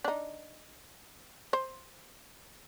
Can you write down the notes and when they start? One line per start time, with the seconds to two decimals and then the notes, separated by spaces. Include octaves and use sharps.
0.04 D4 D#4
1.53 C5